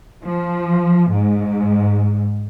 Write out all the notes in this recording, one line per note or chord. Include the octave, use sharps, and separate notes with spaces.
F3
G#2